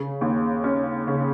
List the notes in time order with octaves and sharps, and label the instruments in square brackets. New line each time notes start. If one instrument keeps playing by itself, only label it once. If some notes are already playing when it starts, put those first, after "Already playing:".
Already playing: [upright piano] C#3
D#2
C#4
C#3